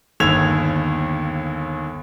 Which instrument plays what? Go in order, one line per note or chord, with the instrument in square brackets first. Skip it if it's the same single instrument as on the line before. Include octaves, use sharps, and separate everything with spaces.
[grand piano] G1 D#2 E6 G#6 F7